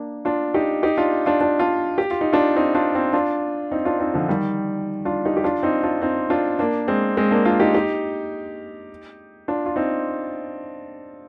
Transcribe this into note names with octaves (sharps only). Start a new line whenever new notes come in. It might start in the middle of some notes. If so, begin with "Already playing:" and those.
Already playing: A#3 D4
D4 F4
D#4 G4
D#4 G4
D4 F4
D4 F4
D4 F4
D4 F4
G4
F4
D#4
D4 F4
C4 D#4
D4 F4
C4 D#4
D4 F4
C4 D#4
D4 F4
C4 D#4
D3 F3
D#3 G3
D4 F4
D#4 G4
G4
D4 F4
C4 D#4
D4 F4
C4 D#4
D4 F4
A#3 D4
G#3 C4
G#3 C4
A#3 D4
D4 F4
D#4 G4
D#4 G4
D4 F4
F4
C4 D#4